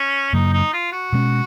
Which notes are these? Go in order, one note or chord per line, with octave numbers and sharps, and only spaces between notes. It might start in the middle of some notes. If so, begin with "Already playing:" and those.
Already playing: C#4
F#2 C#3 F#3 A#3 D#4
D#4
F4
F#4
B2 G#3 C#4